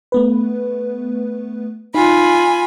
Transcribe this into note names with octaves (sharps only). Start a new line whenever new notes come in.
A3 B3 B4
D#4 F4 G#5 B5